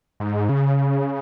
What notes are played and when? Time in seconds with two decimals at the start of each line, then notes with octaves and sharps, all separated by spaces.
0.20 G#2
0.49 C#3